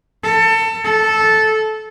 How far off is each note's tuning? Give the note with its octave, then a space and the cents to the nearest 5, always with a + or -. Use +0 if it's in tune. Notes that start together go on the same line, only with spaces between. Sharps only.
A4 +25
A4 -10